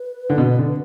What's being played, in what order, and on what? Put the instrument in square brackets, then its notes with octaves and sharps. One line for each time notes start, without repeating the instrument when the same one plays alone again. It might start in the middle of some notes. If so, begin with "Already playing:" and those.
Already playing: [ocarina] B4
[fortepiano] D3
B2
D3